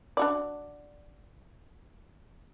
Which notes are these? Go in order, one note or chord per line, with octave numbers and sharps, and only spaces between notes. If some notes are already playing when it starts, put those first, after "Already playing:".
D4 F#4 D5